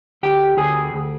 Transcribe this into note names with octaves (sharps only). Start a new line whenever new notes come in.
D2 G4 G5
D2 G#4 G#5
D2